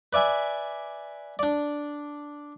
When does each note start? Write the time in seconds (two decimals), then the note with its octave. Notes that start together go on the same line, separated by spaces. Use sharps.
0.13 B4 D5 E5 G#5
1.39 D4 D5